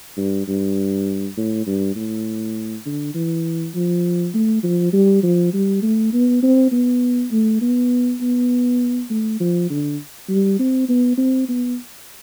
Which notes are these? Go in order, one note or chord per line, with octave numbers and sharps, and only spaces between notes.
G2
G2
A2
G2
A2
D3
E3
F3
A3
F3
G3
F3
G3
A3
B3
C4
B3
A3
B3
B3
A3
F3
D3
G3
C4
B3
C4
B3